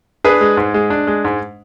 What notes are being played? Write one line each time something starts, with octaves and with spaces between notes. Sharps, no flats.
D4 G#4 B4
G#3
G#2
G#3
D4
G#3
G#2